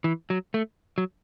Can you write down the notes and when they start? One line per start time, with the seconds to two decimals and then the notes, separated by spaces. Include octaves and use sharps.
0.04 E3
0.30 F#3
0.54 A3
0.98 F#3